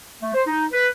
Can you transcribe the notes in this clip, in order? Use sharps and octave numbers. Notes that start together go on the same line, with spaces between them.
A3
C5
D#4
B4